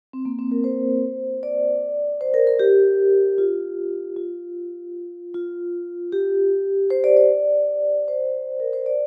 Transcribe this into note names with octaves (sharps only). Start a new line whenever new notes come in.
C4
A#3
C4
A#4
C5
D5
C5
A#4
A#4
G4
F4
F4
F4
G4
C5
D5
D5
C5
A#4
C5
D5